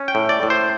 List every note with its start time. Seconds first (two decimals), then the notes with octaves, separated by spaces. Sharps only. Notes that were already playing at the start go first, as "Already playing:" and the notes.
Already playing: C#4
0.08 G5
0.15 A2
0.29 D5
0.43 A2
0.50 C5